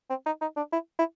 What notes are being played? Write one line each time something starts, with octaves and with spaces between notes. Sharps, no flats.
C4
D#4
D#4
D4
E4
E4